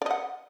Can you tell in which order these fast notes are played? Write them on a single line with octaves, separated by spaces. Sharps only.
D5 D#5 F#5